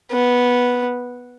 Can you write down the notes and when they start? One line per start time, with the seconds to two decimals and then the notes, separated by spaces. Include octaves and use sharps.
0.12 B3